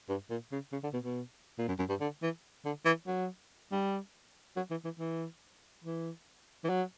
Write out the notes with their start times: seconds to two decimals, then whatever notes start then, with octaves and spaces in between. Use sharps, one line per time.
0.09 G2
0.30 A#2
0.52 C#3
0.72 C#3
0.83 D3
0.93 B2
1.05 B2
1.58 A#2
1.68 F#2
1.79 F#2
1.89 G2
2.00 D3
2.22 E3
2.65 D3
2.85 E3
3.07 F#3
3.72 G3
4.56 F#3
4.70 E3
4.85 E3
4.99 E3
5.84 E3
6.64 E3
6.69 F#3